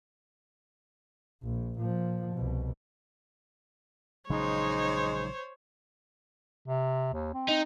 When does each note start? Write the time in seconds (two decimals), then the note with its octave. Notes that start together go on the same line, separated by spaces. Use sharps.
1.43 A#1
1.79 A#2 F3
2.34 C2 B2
4.30 A#1 C#3 F#3 G#3 D#4 C5 C#5
6.68 C3
7.13 D#2
7.34 C4
7.48 D#4